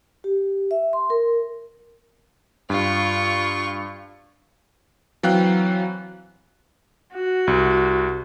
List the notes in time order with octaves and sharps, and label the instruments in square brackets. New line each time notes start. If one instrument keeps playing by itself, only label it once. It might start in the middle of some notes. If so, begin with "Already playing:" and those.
[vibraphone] G4
E5
C6
A#4
[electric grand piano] G2 [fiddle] F4 C#6
[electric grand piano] E3 F#3 C4 F5 G5 F#6
[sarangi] F#4
[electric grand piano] C2